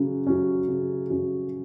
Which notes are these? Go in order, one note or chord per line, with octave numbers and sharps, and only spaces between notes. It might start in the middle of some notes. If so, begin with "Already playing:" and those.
Already playing: C#3 F#3 C#4
F#3 C#4
C#3
F#3 C#4